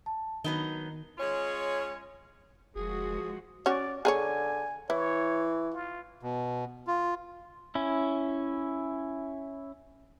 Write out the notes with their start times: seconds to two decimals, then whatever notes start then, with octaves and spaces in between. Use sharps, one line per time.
0.06 A5
0.44 D#3 F#3 B3 D#4 G7
1.18 G#3 C#4 F4 C#5
2.76 F1 F3 G#3 F#4 G#4
3.66 C#4 F#4 C#5 D5
4.05 D3 G#4 A#4 C#5 G#5
4.90 E3 E4 C#5
5.73 F4
6.23 B2
6.87 F4
7.75 C#4 E4